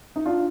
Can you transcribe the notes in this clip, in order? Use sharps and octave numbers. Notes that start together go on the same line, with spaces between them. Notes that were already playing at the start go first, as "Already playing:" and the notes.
D#4
D4 F4